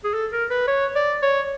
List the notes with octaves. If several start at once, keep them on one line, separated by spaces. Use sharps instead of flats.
G#4
A4
A#4
B4
C#5
D5
C#5